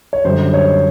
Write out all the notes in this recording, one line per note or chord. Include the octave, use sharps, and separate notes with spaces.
C#5
F#2 D3 G3 C5
C#5